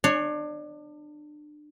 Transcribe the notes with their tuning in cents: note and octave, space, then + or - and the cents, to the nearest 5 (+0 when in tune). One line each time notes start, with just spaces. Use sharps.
D4 +30 C#5 +0